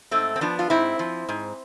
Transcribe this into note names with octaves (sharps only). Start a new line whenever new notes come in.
G#2 A3 C4
C4
F3 B3 D4
F4
G#2 C4 E4
F3
G#2